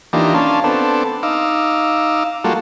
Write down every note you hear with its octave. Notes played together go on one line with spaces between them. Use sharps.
E3 A#3 D4 D#4 F4 G4
C#4 D4 F5 A5 C6
B3 C4 D4 A4
D#4 F5 D6 E6
G3 A#3 F4 F#4 A4